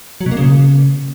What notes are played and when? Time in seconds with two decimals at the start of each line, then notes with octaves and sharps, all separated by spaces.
0.21 F#3
0.26 B2
0.31 A#3
0.37 C#3